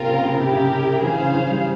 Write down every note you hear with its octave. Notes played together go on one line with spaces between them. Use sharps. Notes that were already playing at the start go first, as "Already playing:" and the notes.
Already playing: C3 A#3 C4 F4 A#4
C#3
C#3
C3 E4 G4 A#4
C#3
E3 G#4 C5 F5
C#3
E3
G3